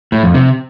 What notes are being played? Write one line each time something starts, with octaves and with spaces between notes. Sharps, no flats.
A2
F2
C3